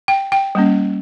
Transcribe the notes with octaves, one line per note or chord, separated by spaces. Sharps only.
G5
G5
G3 A#3 C#4